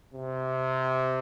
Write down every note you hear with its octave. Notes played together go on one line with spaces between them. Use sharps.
C3